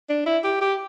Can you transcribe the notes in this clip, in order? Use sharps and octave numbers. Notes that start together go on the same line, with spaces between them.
D4
E4
G4
G4